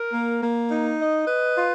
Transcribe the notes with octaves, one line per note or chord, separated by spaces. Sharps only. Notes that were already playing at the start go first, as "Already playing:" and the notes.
Already playing: A#4
A#3
A#3
D#4
D#5
B4
F4